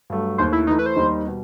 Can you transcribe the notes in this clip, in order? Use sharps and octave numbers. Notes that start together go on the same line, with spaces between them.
G2 F#3 A3
D#2 D#3 A3 C5
E4
E3 A3 D#4 E4
B4
C5
D#2 D#3 G3 D#4
B2 G3